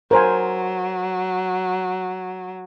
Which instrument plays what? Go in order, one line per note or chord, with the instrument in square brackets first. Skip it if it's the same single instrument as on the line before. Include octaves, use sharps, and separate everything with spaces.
[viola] F#3 [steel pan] A#4 C5 G#5